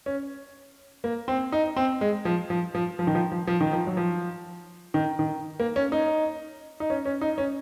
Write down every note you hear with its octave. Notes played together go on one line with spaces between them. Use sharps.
C#4
A#3
C4
D#4
C4
G#3
F3
F3
F3
F3
D#3
F3
F3
F3
D#3
F3
F#3
F3
D#3
D#3
A#3
C#4
D#4
D#4
C#4
C#4
D#4
C#4